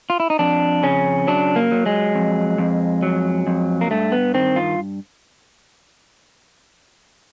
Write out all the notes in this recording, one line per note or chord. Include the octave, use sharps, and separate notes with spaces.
F4
E4
D#4
F2 D4
C#3 C#4
F#3 D4
A#3
F#3
G#3
F2
F2
F#3
F2
A#3
G2 A3
B3
D#3 C4
F4